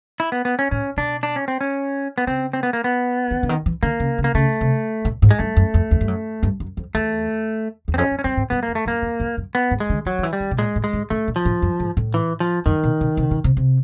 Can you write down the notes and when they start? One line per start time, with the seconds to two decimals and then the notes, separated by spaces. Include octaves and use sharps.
0.20 E4
0.32 B3
0.45 B3
0.59 C#4
0.71 A2 C#4
0.97 B2 D4
1.23 D4
1.36 C#4
1.48 C4
1.61 C#4
2.18 B3
2.27 C#3 C4
2.53 C4
2.63 B3
2.73 A#3
2.84 B3
3.31 D#3
3.43 D3
3.49 D#3
3.66 E3
3.83 D3 A#3
4.00 C#3
4.18 C#3
4.24 A#3
4.34 C#3 A3
4.61 C3
5.05 A2
5.22 G#2
5.31 G#3
5.39 G2 A3
5.56 F#2
5.74 F2
5.91 E2
6.01 G2
6.08 F#2
6.43 G2
6.60 F#2
6.77 F2
6.94 E2 A3
7.88 E2
7.94 C4
7.98 F2 C#4
8.11 F#2
8.19 C#4
8.24 G2 C4
8.37 G#2
8.50 G2 B3
8.63 A#3
8.68 F2
8.75 A3
8.86 F#2 A#3
9.02 E2
9.20 F2
9.37 F#2
9.55 B3
9.71 G#2
9.80 G#3
9.90 D3
10.06 E3 F#3
10.19 D#3
10.23 E3
10.33 G3
10.40 D#3
10.51 B2
10.58 A#2 G#3
10.76 A2
10.84 G#3
10.93 G#2
11.10 A2 A3
11.28 A#2
11.36 F3
11.45 A2
11.62 F#2
11.80 G#2
11.97 A2
12.14 E3
12.40 F3
12.66 F#2 D#3
12.83 B2
13.01 B2
13.17 C3
13.31 B2
13.44 C3
13.57 C3